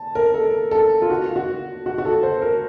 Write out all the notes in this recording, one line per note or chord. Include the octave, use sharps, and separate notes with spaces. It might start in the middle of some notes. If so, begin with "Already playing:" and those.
Already playing: A5
A#4
A4
A4
F4
F#4
F#4
F#4
F#4
A4
C5
A#4